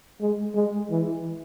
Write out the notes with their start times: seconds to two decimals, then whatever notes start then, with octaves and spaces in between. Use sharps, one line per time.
0.21 G#3
0.55 G#3
0.90 E3